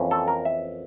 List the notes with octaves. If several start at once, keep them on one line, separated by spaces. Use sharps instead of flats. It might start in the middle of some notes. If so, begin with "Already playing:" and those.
Already playing: F2 E3 A#3 C#4
A4
A#4
E5